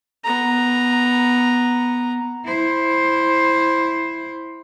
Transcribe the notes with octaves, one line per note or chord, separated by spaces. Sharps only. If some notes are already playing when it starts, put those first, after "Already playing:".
B3 A#5
E4 C5